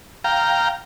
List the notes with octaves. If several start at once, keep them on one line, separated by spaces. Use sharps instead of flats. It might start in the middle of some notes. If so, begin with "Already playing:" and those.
F5 G5 A#5